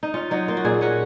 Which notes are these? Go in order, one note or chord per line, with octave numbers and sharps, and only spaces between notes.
D#4
C#4 F4
F#3 D#4
A#3 F4
F#4
A#2 G#4
C#4 F#4